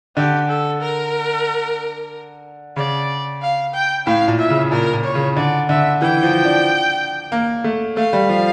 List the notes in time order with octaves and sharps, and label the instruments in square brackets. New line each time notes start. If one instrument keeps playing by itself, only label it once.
[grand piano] D3 [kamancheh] G4
[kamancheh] A4
A#4
[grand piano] C#3 [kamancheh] D5
[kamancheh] F5
G5
[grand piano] A2 [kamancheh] F5
[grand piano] A#2
[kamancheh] E5
[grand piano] C#3
[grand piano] A#2 [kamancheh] A#4
[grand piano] A#2
[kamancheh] C#5
[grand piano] C#3
[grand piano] D3 [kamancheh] D5
[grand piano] D3 [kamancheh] E5
[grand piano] E3 [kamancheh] G5
[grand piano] F3
D4
A#3
A3
[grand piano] A3 [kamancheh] F5
[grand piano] G3
F3